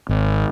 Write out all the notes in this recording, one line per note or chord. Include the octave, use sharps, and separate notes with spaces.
G#1